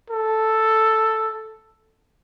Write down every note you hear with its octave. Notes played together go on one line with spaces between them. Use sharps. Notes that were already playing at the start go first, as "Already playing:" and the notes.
A4